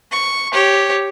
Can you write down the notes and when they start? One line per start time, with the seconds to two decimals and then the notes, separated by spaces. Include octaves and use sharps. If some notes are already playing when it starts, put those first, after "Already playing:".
0.12 C#6
0.53 G4 C#5